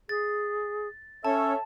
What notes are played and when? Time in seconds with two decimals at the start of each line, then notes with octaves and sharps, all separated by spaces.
0.09 G#4 A6
1.24 C#4 A4 C#5 E5 A5